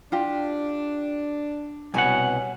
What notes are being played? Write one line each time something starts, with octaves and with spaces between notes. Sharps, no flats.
D4 F4 G4
C2 B2 C#5 F#5 G#5